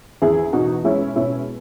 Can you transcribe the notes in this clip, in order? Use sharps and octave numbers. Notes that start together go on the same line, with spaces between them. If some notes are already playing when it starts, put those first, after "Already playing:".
E2 E4 G#4
B2 D#4 F#4
G#3 C#4 E4
B2 C#4 E4